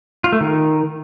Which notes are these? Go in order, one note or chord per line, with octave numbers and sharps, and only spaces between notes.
F4
A3
D#3